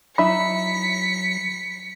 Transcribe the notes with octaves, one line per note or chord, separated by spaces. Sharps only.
F#3 D#4 E4 E5 B5 B6 C#7